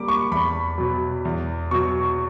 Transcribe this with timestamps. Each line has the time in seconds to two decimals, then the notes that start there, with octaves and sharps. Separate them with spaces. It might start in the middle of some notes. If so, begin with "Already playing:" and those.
Already playing: C#3 G3 A#3 B5 D6
0.08 C#6
0.31 E2 B5
0.78 B2 F#3
1.25 E2
1.71 B2 F#3 C#6